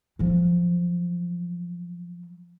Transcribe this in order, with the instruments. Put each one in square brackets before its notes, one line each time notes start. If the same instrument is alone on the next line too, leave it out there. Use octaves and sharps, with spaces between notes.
[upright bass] F3 F#3